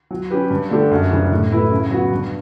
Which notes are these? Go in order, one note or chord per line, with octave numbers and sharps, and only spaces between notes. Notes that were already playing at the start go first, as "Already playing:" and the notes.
F#3
C#4 G4 B4
G2
D3 A3 D4 G4
F#2
C#3 E3 G3 D4
A2
F#3 A3 E4 B4
C#3
F#3 B3 F#4
G2